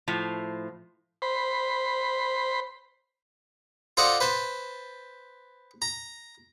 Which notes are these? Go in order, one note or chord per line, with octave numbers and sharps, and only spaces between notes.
A2 F3
C5 B5
F4 A4 C5 D5 D#5 F#5
B4 C5 A5
A#5